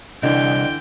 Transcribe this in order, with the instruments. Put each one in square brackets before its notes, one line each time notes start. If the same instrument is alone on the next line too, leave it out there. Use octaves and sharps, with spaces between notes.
[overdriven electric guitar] C2 [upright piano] D3 E3 [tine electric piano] D4 D5 D#5 [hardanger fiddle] G5